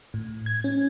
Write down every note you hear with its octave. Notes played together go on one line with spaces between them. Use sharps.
A2
G#6
C#4